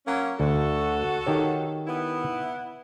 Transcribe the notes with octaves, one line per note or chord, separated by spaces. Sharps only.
F#3 A#3 C#4
D2 F#4 A4
D#3 G4 C#5
B3 E4